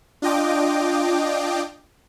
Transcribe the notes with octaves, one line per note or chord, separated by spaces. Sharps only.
D4 F4 D#5 G5 D6